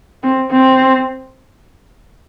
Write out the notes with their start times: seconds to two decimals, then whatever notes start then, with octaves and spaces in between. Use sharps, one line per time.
0.23 C4
0.52 C4